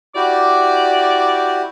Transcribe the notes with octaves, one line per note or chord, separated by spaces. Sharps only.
E4 F#4 G4 D5 D6